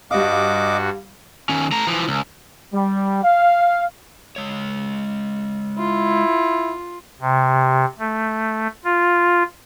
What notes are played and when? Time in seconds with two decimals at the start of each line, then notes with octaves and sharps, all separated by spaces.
0.11 G2 G3 F#4 D#5 F5 D6
1.49 D#3 C#4
1.72 A3 A#5
1.87 E3 F3
2.08 C#2
2.74 G3
3.23 F5
4.36 G#3 C#5
5.78 E4 F4
7.21 C3
7.99 A3
8.85 F4